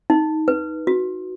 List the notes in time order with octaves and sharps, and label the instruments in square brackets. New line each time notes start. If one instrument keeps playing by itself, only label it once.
[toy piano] D#4
B4
F#4